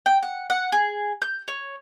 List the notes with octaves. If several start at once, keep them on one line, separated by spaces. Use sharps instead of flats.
G5
F#5
F#5
G#4
G6
C#5